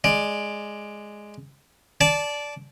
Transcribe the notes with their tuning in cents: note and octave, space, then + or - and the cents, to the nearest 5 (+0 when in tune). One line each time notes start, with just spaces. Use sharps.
G#3 +0 D5 +10
D5 -10 A5 -20